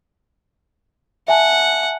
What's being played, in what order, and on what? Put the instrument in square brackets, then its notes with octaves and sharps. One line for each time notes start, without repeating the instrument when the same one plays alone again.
[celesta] E5 G#5 A5 [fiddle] F#5